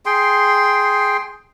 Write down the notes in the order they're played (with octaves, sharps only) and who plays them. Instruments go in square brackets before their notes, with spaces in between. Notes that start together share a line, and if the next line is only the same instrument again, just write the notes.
[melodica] G#4 G5 C6